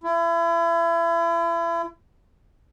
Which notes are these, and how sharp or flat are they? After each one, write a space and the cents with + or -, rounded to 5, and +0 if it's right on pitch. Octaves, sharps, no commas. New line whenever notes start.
E4 +35